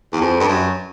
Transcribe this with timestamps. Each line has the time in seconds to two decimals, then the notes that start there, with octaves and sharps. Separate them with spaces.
0.13 E2
0.21 F2
0.40 G2
0.48 F#2